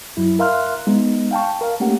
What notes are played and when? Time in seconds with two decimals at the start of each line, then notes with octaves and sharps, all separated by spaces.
0.17 F#2 F#3 E4
0.39 A#4 E5 F5 C6 F6 F#6
0.87 G#3 B3 D#4
1.31 F5 G5 A5 C#6
1.61 A#4 F5
1.80 A3 A#3 C#4 G4 F#5